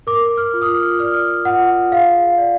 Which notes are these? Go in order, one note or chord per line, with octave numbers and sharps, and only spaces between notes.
A#4 D6
F6
F4
D#6
F6
D5 F6
F4 F#5
G#4 F5
D5